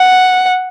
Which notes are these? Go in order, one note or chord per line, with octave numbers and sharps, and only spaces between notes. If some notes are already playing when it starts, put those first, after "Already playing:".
Already playing: F#5